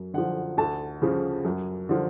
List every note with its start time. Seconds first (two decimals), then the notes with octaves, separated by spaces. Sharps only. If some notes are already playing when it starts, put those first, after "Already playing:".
Already playing: F#2
0.14 D3 F3 F#5
0.57 D2 A5
1.02 C#3 F3
1.45 F#2
1.89 D3 F3